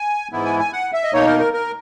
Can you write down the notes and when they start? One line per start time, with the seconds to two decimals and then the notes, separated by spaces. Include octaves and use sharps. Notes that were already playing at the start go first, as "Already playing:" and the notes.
Already playing: G#5
0.32 G#2 E3 B3 E4
0.46 G#5
0.59 G#5
0.73 F#5
0.93 E5
1.04 D#5
1.13 B2 A#3 D#4 C#5
1.27 A#4
1.40 A#4
1.53 A#4